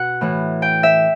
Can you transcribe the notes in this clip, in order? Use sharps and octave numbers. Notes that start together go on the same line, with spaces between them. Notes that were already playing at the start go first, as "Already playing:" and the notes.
Already playing: B2 F#5
A2 E3
G5
E5